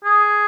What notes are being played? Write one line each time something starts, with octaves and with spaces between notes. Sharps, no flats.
G#4